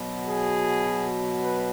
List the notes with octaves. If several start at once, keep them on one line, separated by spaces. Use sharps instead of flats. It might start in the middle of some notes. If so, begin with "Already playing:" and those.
Already playing: B2 F#3
G#4
B4